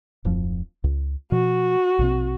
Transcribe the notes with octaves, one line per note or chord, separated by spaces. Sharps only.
D1 F2 F3
C#2
B2 F3 F#4
A#1 B2 C4